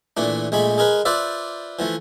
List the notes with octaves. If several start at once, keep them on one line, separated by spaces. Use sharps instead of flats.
A#2 E3 A3 D4
A#1 G#3 A3 G#4 B5
G#3 G#4 A#4 B4
F4 B4 C5 D5 E5
E3 F3 A3